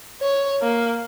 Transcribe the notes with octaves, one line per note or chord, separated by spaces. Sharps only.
C#5
A#3